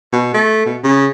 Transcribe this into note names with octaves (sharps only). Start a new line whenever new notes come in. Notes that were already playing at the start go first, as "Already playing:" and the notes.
B2
A3
B2
C#3